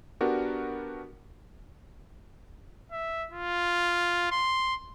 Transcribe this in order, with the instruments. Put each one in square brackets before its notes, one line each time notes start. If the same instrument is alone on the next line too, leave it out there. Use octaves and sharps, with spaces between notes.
[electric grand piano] B3 D4 F#4 G4 A#4
[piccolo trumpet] E5
F4
C6